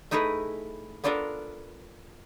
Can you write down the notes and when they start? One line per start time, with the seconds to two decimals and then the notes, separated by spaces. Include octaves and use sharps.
0.11 A3 D#4 E4 G#4 B4
1.04 B3 D4 F4 A4 A#4